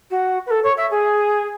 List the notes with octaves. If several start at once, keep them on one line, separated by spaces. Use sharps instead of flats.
F#4
B4
A4
C#5
E5
G#4